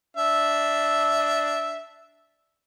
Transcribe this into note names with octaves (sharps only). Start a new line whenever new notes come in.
D4 E5